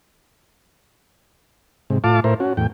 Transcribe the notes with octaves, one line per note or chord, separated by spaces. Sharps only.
G#2 C3
A2 F4 F5 A5 D6
A2 E4 A#4 C5
C#4 F#4
E2 A2 G5